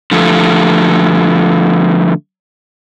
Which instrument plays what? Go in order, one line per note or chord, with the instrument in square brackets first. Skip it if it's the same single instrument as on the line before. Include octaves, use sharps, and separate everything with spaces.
[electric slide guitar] D3 F3 A3